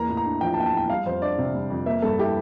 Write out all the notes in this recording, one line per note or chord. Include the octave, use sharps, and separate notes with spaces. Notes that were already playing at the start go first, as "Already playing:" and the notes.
Already playing: E2 A#3 A#5
A2
A#5
D4
F3 G5
A5
A#3 G5
A5
A2 G5
G3 F5
F2 C5
D4 D5
C3
G3
F2
A#3 E5
G2 A4
E4 G4